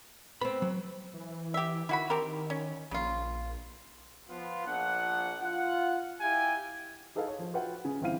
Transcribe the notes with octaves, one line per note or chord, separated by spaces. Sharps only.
B3 C4 B5
F#3
E3
G4 E5
D#3 E4 F#4 B5
C4 G4 A#4
C#4
A#1 C#3 F4
F3 B3 F4
A#1 F3 D4 F#5
F4 F#5
E4 G4 F5 G5 G#5
D#4 G#4 A4 B4 D#5 F5
C#5
F3
F4 F#4 B4 E5 F#5 G5
C#3 G#5
G1 E3 C4 E4 F5 D#7